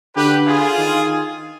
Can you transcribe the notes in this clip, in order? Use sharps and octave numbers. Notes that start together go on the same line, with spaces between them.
D3 G4 B4
F4 G#4
D#3